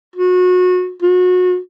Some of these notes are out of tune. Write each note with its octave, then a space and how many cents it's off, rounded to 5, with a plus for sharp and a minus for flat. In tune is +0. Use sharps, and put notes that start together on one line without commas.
F#4 -30
F#4 -30